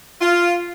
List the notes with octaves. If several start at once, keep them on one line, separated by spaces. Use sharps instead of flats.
F4